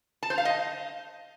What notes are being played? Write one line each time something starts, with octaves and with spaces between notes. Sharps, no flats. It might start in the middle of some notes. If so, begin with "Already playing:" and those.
A5
C5
F5
D#5